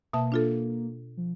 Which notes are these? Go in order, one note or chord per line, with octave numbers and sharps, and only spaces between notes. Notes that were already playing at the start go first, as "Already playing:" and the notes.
B2 A#3 E5 A5
D4 F4 A4
F3